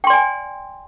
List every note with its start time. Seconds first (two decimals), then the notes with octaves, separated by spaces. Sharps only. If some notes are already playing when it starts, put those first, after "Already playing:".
0.04 G5
0.07 C6
0.10 D5
0.13 G#5